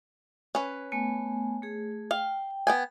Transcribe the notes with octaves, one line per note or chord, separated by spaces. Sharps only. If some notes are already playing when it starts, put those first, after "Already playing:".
C#4 B4
A3 B3 G#5
A3 G#4
F5 G5
B3 G5 G#5